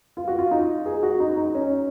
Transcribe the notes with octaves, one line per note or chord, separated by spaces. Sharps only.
F4
F#4
F4
D#4
G#4
F#4
D#4
D#4
C#4